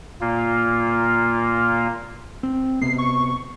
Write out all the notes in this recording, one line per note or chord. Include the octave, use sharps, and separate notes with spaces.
A#2 A#3 F4
C4
C3 B3 C7
C#6